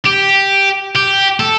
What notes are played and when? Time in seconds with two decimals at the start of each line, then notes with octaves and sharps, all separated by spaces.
0.06 G4
0.96 G4
1.40 A4